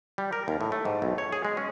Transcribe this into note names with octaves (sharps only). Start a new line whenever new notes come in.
G3
A#4
D#2
A2
A3
G#2
B1
C#5
G#4
G#3
C#4